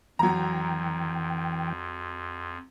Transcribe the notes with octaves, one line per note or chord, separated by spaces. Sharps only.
F2 E3 F#3 G5 A#5